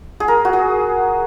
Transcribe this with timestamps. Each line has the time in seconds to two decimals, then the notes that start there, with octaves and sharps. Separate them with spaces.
0.20 G#4
0.28 A#4
0.45 F#4
0.53 G#4